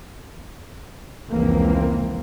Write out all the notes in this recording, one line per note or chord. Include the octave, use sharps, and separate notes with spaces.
F1 C#2 E3 A#3 C4